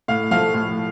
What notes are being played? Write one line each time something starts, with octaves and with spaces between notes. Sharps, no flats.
A2 F5
F3 A3 F5
A2